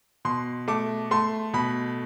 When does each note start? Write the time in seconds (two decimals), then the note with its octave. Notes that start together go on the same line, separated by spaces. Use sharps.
0.25 B2 C6
0.68 A3 D6
1.11 A3 C6
1.53 B2 B5